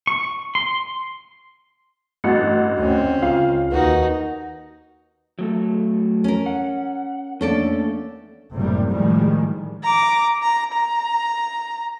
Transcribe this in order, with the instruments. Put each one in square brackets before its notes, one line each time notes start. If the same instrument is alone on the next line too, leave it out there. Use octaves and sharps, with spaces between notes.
[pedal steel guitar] C#6
C6
[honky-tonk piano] A1 F#4 [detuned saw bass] G2 [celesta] A6 C#7
[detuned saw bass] D2 [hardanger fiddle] C4 C#4
[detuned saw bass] C#2 [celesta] F4 [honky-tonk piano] F5
[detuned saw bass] D#2 [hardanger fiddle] D#4 F#4 [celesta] A#4 B4
[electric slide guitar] F#3 A3 A4
[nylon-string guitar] C#4 A#4
[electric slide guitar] F#5
[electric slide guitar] A3 A#3 D4 [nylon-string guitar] C#4 A4 D5
[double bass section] F#1 A2 C3 G3 A#3
A2 D#3 F3 G3 G#3
[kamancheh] A#5 D6
A#5
A#5